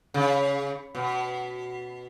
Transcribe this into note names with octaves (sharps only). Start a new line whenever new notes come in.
C#3
B2